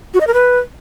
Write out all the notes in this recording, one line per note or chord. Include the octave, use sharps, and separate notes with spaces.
F#4
D#5
A#4
B4